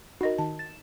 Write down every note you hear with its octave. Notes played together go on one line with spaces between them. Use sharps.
D#4 F#4 A#4 D#5
D#3 A5
A6 E7